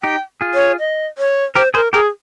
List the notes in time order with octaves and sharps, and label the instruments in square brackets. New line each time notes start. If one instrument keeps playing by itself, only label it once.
[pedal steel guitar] D#4 G4 [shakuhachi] G5
[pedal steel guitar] F4 G#4
[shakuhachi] C#5
D#5
C#5
[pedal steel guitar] G4 A#4 [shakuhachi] C5
[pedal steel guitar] G#4 C5 [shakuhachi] A#4
[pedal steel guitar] G4 A#4 [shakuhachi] G#4